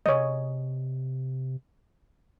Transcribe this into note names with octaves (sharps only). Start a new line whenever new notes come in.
C3 C#5 D#5